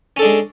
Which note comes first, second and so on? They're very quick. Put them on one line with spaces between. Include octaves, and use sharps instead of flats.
C#4 A4 D4 G#3